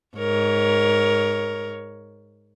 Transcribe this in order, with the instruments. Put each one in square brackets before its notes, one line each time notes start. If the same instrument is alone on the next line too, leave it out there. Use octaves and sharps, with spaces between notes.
[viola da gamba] G#2 A#4 C#5